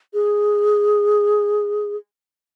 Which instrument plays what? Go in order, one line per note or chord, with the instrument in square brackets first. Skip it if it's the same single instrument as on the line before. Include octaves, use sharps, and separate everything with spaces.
[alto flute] G#4